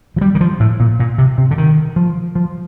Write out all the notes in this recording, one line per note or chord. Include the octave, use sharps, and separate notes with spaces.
F3
G3
D#3
F3
A2
A#2
A#2
C3
C3
D3
D#3
F3
F3